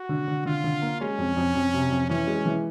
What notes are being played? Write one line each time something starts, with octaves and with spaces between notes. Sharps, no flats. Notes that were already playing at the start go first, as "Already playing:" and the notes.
Already playing: F#4
D3
D3
D3 F4
D3
A#3
G#3 C#4
F2
F2
F2
C3
F2
E3 C#4
G#3
E3